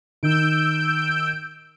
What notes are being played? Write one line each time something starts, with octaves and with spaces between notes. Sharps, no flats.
D#3 E6 G6 D7